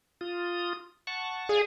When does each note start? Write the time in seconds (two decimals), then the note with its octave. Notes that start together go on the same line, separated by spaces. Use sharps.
0.21 F4 D#6
1.07 F#5 A5 C#6
1.49 G#4 D5 F5 G#6